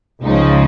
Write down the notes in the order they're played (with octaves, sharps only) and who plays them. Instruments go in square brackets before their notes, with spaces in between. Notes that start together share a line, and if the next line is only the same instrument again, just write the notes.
[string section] C#2 C#3 F3 D#4